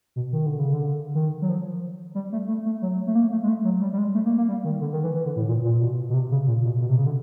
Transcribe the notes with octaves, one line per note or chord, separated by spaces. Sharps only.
B2
D#3
D3
C#3
D3
D#3
F#3
F3
G3
A3
A3
A3
F#3
A3
A#3
A3
G#3
A3
F#3
G3
G3
G#3
A3
A#3
A#3
G3
D#3
D3
D#3
E3
E3
D3
A2
A#2
A#2
B2
B2
C3
C#3
A#2
B2
B2
C3
C#3
D3